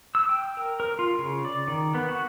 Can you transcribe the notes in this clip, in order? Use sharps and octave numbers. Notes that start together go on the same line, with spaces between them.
E6
G5
A#4
A#4
F4
C#3
D5
D#3
B3
F#4